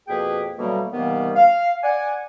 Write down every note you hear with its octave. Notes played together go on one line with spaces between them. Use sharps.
F2 B2 A#3 G#4 B4 G5
B2 D3 F#3 G3 A3 A#3
C3 D#3 E3 G3 A#3 B3
F5
D5 F#5 G#5